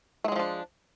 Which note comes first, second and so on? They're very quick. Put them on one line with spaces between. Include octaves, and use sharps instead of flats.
A3 G#3 F#3 F3 D4